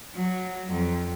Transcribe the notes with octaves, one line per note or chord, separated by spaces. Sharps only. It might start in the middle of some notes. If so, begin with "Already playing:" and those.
F#3
F2